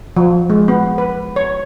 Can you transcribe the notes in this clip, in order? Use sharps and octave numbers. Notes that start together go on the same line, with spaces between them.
F3
G#3
B3
B4
C#5